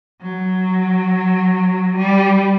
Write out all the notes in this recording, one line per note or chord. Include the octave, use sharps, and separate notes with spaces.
F#3
G3